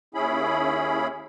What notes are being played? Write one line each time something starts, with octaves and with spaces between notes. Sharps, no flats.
D#2 C#4 E4 G#4 B5